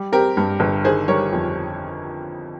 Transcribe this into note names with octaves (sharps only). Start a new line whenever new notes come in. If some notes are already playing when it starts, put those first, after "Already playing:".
Already playing: G3
C4 G4 A#4
G2
G1
D#3 G#4 C5
G3 A#4 C#5
F2